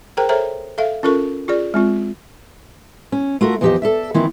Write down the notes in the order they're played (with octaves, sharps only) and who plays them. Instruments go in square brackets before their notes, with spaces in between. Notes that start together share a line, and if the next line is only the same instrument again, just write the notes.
[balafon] G#4 A#4 C5 G5 A#5
A4 C5 C#5 E5 A#5
A4 E5 F5
C#4 F4 A4 A#4 C#6
F4 G#4 D5
G#3 C4 F4
[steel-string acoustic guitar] C#4
A3 F4 F#4 A4 A#4
E2 F3 D#4 G4 C5 D#5
A4 D5 E5
D#3 E3 A#3 C4 E4 F4